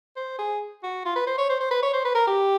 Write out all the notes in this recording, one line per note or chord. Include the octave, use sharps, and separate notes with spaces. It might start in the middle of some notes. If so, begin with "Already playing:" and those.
C5
G#4
F#4
F4
B4
C5
C#5
C5
C5
B4
C#5
C5
B4
A#4
G4